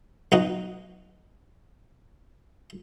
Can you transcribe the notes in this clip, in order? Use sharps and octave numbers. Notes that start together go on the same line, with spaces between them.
B1 D#4 F#4